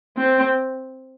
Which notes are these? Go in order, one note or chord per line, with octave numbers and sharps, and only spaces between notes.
C4